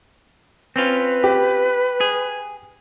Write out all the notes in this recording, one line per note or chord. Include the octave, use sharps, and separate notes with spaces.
C4 C#4 F4 B4
G4
G#4